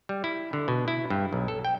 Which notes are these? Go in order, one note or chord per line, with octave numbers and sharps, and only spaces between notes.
G3
E4
D3
B2
E4
G2
B1
A4
G5